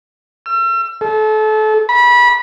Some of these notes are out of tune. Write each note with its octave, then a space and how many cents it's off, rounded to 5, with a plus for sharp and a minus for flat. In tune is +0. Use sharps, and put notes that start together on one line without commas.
E6 +40
A4 -30
B5 -25